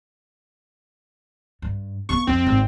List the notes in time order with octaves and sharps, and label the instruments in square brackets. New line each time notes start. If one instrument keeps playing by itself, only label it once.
[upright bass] G2
[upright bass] A#3 B3 [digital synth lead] C#6
[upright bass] F2 [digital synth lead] C4
[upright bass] G#1